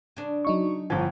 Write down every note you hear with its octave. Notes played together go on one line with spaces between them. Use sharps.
C#3 D4
F#3 D#4 C#6
G1 E3 F3 G#5